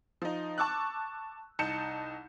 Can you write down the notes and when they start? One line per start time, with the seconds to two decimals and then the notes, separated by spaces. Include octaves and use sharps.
0.22 F3 D#4
0.58 A5 C#6 D6 E6 F#6
1.59 C2 D#4 A5 G6 C#7 E7